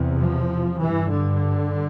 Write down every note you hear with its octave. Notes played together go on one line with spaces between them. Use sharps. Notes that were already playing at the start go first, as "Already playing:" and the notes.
Already playing: E2 C3
F3
G2 E3
D3